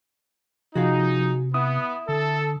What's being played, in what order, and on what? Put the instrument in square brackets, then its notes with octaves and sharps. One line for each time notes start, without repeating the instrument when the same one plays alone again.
[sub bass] C3 [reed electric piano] F3 [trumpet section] D#4 [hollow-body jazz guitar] F#4 G#4 F5
[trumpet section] B3 [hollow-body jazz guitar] E4 [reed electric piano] D#6
[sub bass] D3 [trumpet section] A4